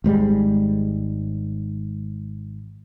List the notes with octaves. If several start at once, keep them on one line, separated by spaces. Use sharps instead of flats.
G#1 G#2 G3 G#3